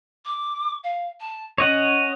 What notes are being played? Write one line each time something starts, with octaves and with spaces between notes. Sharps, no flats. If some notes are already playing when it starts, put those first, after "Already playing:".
D6
F5
A5
C#4 C#5 D#5 F#5